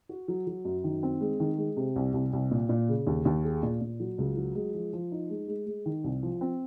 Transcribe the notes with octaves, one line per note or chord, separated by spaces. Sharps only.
F#4
F#3
F#3
F#2
D#3
C4
G#3
D#3
G#3
C3
C2
C2
C2
A#2
A#2
C#3
D#2
D#2
G#4
A#2
A#2
F#3
C#2
F#3
G#3
F3
F3
D#4
G#3
G#3
G#3
D#3
C2
F3
C4